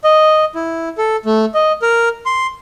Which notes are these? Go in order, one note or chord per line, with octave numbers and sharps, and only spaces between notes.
D#5
E4
A4
A3
D#5
A#4
C6